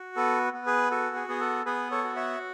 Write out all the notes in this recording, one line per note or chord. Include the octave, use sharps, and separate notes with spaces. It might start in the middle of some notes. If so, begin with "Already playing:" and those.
Already playing: F#4
B3 A4
B3
G#4 B4
F#4 A4
G#4
B3 G#4
A4
B3 G#4 B4
A4 C#5
F#4
C#5 E5